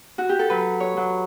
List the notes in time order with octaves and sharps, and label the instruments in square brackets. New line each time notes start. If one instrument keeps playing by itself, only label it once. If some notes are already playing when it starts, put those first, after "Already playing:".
[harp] F#4
G4
A4
F#3 B4
C#5
F#3